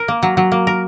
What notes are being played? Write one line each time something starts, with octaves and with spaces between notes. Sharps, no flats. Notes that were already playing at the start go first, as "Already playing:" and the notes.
Already playing: A#4
A#3
F#3
F#3
A#3
A#4